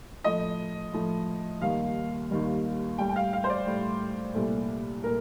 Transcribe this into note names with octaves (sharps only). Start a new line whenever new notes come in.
A2 F3 A3 D#5
A2 F3 A3
D#2 D#3 G3 F5
D#2 D#3 G3
A2 G3 G5
G5
F5
F5
C5
D5
A2 G3
C2 A#2 A3
A#2 A3 A#4